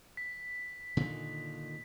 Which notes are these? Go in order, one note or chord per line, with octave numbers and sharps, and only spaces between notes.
B6
A#2 D3 D#3